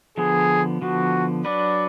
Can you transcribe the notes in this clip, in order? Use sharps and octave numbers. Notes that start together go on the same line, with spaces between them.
D3 F3 B3 G#4
D3 F3 B3 F#4
F#3 D4 F#4 B4 D5